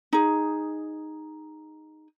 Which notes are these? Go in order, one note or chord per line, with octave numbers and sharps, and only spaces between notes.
D#4 G#4